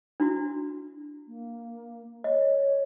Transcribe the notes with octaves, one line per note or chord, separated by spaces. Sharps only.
D4 E4 F#4
A#3
C#5 D#5